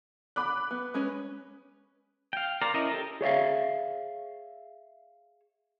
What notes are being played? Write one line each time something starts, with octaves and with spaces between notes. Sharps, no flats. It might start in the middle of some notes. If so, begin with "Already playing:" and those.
B5 D6 F#6
B3
G#3 C#4 B4
F5 G5
A#4 C5 D5 F5 A#5
C#4 E4 A#4 D#5 E5
G4 A4 A#4
G#4 C#5 E5 F5